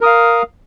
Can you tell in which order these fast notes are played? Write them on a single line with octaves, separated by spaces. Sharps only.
A#4 D#6 F5